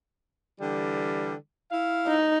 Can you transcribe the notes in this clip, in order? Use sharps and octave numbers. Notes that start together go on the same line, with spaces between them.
D3 E3 G3
E4 F5
D#4